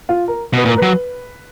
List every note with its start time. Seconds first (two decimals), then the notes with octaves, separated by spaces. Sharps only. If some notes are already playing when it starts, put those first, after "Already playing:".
0.09 F4
0.28 A#4
0.53 B2 B4
0.65 A#2
0.68 A#4
0.78 F#3 B4